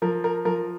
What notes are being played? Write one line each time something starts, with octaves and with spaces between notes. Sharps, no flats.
F3 A#4
A#4
F3 A#4